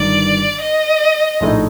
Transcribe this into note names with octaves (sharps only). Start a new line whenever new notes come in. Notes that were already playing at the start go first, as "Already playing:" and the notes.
Already playing: G1 G2 D#3 D5
D#5
A#1 A2 A3 D#4